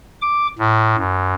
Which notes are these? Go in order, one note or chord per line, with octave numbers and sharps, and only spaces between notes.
D6
A2
F#2